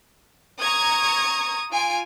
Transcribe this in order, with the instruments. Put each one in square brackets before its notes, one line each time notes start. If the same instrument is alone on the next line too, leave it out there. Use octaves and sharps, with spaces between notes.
[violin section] A#5 C#6 G#6 [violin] D#6
[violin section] F4 G#5 D7